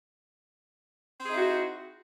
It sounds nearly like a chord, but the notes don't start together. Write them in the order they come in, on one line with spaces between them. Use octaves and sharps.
C4 G#4 D#4 E4 F#4